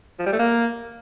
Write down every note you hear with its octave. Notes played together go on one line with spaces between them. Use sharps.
F3
G3
A3
A#3